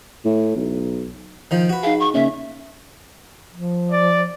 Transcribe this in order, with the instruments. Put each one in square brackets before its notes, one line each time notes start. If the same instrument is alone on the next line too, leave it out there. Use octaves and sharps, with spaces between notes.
[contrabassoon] A2
B1
[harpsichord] D#3 F3
F#4 B4
[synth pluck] D#4 G#4 [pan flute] F5
[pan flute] C#6
[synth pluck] C#3 A#3 C#4 [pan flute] E5
[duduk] F3
[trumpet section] D5